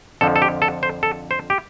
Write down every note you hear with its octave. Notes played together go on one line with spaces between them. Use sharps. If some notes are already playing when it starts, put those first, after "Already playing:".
F2 D3 F3 A4
A4
G4
A4
C5
A4
C5
G4